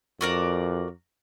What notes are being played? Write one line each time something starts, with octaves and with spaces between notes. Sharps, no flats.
F2 F#4 A#4 D5